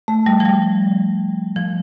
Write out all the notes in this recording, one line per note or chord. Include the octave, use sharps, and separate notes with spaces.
A3
G3
F3
G3
F3